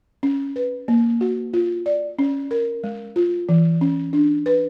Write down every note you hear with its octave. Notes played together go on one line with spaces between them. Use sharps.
C#4
B4
A#3
F#4
F4
D5
C#4
A#4
G#3
F4
E3
C#4
D4
B4